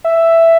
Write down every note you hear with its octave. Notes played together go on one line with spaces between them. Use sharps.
E5